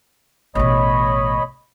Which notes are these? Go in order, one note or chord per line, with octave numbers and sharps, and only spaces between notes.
A1 B2 C#5 D#5 B5